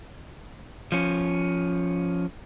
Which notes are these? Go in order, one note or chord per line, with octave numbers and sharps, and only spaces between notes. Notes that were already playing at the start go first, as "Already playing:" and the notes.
F3 C#4